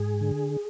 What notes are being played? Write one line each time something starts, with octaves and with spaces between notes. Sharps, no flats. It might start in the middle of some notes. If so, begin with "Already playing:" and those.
Already playing: G#2 G#4
D3